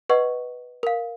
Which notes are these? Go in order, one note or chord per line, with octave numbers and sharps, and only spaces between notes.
B4 D#5 F#5 C#6
A#4 F5